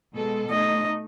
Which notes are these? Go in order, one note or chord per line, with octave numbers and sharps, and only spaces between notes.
B2 G#3 A4
A3 D#4 D#5